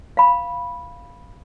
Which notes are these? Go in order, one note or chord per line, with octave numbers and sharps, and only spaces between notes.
F5 B5